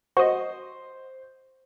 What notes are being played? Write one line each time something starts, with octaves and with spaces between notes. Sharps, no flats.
F#4 C5 D#5